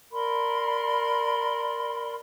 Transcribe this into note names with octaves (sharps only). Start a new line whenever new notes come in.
A#4 D5 B5 C6